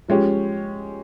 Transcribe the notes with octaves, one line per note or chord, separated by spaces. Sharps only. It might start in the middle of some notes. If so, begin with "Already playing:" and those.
F3 G#3 C#4 G4